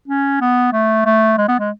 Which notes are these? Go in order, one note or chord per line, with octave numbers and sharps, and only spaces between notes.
C#4
B3
A3
A3
G#3
B3
G#3